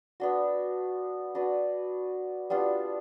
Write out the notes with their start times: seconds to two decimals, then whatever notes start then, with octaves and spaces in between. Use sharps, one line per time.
0.20 B3 D4 F#4
1.35 D4 F#4 B4
2.50 G3 B3 D4 F4